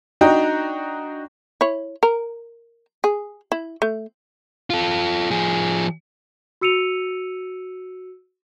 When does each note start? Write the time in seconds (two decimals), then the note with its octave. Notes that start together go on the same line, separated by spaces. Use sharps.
0.21 D4 D#4 F#4 D#5 G5 A#5
1.61 E4 C#5
2.03 A#4
3.04 G#4
3.52 E4
3.82 A3
4.70 F4 A4
5.31 F3 G#4
6.61 F#4 E6 C#7 D#7 F7